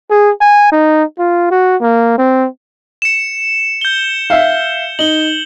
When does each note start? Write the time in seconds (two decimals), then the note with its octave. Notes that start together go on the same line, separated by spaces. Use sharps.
0.10 G#4
0.41 G#5
0.72 D#4
1.19 F4
1.51 F#4
1.81 A#3
2.18 C4
3.02 C#7 E7
3.81 G6 G7
4.30 E5 F5
4.99 D#4 F#7 G7